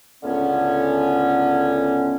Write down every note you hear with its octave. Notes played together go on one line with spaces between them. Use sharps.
C#2 A2 D3 B3 C#4